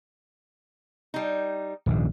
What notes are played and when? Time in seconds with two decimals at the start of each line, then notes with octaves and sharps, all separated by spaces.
1.14 G3 D#4
1.86 D#1 A#1 G#2